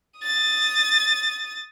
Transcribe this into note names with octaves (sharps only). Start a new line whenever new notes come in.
D#6 A6